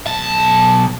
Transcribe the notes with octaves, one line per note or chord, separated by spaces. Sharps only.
B1 A5